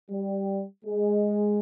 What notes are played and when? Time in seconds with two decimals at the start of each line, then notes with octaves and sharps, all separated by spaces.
0.10 G3
0.85 G#3